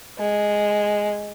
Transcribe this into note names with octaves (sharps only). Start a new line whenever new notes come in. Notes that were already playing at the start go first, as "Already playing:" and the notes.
G#3